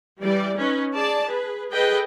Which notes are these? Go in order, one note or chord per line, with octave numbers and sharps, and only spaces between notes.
E3 G3 D5
C#4 D#4 B4
G#4 D5 A5
G#4 B4
G#4 A4 B4 D#5 G5